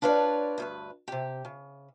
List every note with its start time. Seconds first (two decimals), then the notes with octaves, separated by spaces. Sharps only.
0.02 D4 F4 B4 C#5 D5
0.58 D2 G2 B4
1.08 C3 G4
1.45 C#3